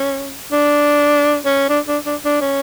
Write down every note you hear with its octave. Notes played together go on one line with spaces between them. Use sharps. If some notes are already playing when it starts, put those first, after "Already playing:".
Already playing: C#4
D4
C#4
D4
D4
D4
D4
C#4